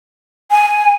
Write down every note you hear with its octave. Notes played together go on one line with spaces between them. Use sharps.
G#5